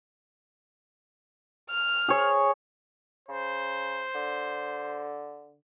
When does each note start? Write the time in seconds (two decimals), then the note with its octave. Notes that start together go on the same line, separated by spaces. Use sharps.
1.70 F6
2.08 G#4 C#5
3.29 C#3 C5
4.14 D3